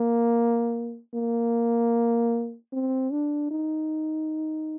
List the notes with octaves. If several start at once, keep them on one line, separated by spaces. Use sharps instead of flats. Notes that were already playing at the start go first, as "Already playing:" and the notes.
Already playing: A#3
A#3
C4
D4
D#4